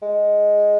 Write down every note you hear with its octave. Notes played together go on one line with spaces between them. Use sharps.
G#3